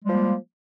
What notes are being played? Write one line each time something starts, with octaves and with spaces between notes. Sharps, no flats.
F3 G3 G#3 A#3